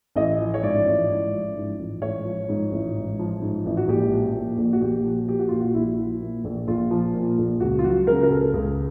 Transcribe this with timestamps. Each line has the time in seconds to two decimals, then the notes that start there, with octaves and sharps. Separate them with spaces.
0.16 A1 D#5
0.40 F3
0.54 C#5
0.63 G#2 D5
0.87 A1
1.10 A1
1.33 F3
1.56 G#2
1.79 A1
2.02 A1 C#5
2.25 F3
2.49 G#2
2.72 A1
2.95 A1
3.19 F3
3.41 G#2
3.66 A1
3.77 F#4
3.88 A#1 G4
4.12 F3
4.34 A#2
4.58 A#1
4.73 F#4
4.81 A#1 G4
5.04 F3
5.27 A#2 G4
5.39 F#4
5.49 A#1 F4
5.60 F#4
5.74 A#1 E4
5.97 F3
6.21 A#2
6.44 A#1
6.67 A#1 F4
6.91 F3
7.15 A#2
7.38 A#1
7.60 C#2 F#4
7.79 F4
7.84 F#3 F#4
8.07 C#3 A#4
8.23 A#4
8.30 C#2 A4
8.53 C#2 G#4